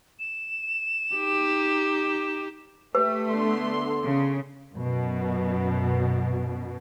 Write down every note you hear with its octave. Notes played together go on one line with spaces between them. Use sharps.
E7
D#4 G4
A3 G4 B4
D3 B3 C6
C#3
F#2 B2